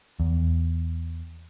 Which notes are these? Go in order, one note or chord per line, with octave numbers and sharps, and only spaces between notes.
E2